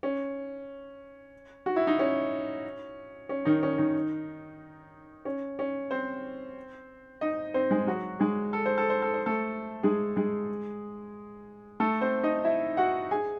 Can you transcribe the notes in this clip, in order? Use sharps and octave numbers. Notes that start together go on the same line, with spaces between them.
C#4
F#4
E4
D#4
C#4
C#4
D#3 D#4
C#4
D#3 D#4
C#4
C#4
C4 C5
D#4 D#5
C4 C5
G#3 G#4
F#3 F#4
G#3 G#4
A4
C5
A4
C5
A4
C5
A3 A4
G#3 G#4
G#3 G#4
A3 A4
C4 C5
D#4 D#5
E4 E5
F#4 F#5
G#4 G#5